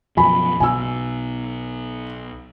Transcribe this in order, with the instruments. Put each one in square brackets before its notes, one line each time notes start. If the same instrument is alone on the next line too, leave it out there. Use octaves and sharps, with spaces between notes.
[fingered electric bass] F#2 B2 F3 [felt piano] G#5 B5
[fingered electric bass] B1 B2 [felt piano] G#5 E6